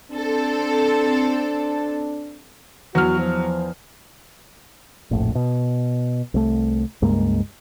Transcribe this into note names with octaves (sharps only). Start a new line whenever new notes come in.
C4 D4 A4
E2 F#3 F#4 F6
F3
F1 A#1 A2
B2
C2 A3
C#2 G2 G#3 A#3